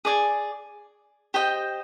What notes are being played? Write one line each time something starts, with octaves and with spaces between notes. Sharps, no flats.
G#4 D5 G#5
G4 C5 D#5 G5